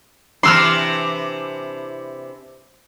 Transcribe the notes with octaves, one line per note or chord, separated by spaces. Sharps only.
C3 E3 D4 C6 E6 F6